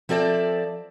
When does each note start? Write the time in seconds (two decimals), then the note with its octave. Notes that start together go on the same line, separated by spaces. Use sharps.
0.09 F3 C4 A4 D5 E5